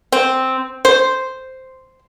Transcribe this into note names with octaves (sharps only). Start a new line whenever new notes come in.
C4
C5